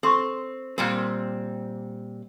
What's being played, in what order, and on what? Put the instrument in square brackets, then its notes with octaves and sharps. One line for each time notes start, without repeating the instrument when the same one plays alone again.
[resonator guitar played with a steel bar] C4 [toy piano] A4 C6 C#6
[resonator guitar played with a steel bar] A#2 G3 C4 [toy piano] A#4